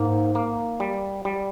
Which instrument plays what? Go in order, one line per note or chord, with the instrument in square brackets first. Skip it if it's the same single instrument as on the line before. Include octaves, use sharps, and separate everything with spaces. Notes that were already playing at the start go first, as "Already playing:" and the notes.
Already playing: [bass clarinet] G#2 [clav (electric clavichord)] A#3
[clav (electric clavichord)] A#3
G3
G3